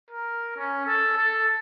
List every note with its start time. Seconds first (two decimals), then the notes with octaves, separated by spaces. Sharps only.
0.10 A#4
0.56 C#4
0.86 A4
1.17 A4